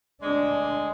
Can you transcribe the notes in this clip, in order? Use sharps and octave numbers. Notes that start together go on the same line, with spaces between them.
D2 G#3 D4